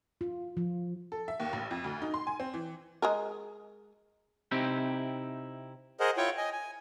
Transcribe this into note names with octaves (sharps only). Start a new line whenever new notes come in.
F4
F3
A4
E5
D#2
A1
F2
D2
D#4
C6
G#5
C4
E3
G#3 G#4 A#4
C3 C4 D#4 E4 G4
G#4 A#4 C5 D#5 F#5
E4 F4 C#5 G5 C#6
D#5 G#5
G#5